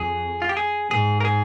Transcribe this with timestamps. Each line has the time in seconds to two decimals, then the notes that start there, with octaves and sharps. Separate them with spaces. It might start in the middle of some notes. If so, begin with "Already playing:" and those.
Already playing: F2 G#4
0.42 F4
0.49 G4
0.57 G#4
0.91 G#2 G#4
1.20 A#4
1.25 G#4